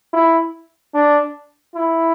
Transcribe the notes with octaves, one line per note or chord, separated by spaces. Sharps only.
E4
D4
E4